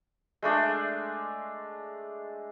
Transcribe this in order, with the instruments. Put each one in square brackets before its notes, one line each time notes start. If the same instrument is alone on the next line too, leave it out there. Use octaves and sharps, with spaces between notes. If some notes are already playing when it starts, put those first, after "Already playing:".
[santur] G#3 A3 D4 A4